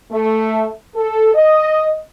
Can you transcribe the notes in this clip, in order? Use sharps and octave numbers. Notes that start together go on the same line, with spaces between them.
A3
A4
D#5